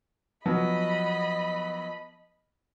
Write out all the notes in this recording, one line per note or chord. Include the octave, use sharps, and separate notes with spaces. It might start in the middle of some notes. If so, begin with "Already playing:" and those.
F3 F#3 B3 D#5 B5